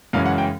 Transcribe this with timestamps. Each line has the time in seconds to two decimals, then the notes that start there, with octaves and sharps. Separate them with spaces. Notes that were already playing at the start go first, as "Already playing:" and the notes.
0.13 F#2 C#3 E3 G#3 C#4 F5
0.26 F#5
0.38 G5